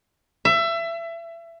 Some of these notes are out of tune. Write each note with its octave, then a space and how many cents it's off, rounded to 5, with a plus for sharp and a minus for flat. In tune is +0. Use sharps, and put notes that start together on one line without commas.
E5 +25